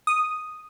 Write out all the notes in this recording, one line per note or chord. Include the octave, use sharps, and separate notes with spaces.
D#6